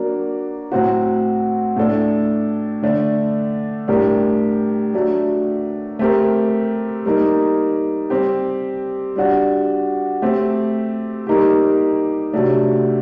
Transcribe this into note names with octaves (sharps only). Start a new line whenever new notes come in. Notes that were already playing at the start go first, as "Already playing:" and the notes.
Already playing: F#3 A#3 D4
A2 F#3 C4 F#4
A2 A3 D4 A4
D3 A3 D4
A2 G3 D4 G4 A#4
F#3 A3 D4
A3 C4 G4 A#4
G3 A#3 D#4
G3 C4 G4
G3 D4 F#4
A3 C4 G4
G3 A#3 D#4 G4
C3 F#3 A3 D4